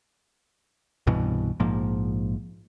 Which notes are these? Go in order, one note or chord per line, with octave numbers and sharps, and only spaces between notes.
C2 G2 B2 E3
A#1 G#2 F3 A#3